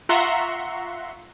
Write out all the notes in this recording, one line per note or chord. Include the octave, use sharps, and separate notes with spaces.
F4 E5 F#5 A#5 C6 C#6